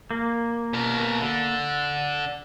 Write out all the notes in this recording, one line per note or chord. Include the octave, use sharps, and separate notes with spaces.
A#3
B2 A#4
D3